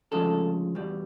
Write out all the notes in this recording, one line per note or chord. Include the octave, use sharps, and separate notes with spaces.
D2 C#3 F3 G#3 A4
E2 B2 G3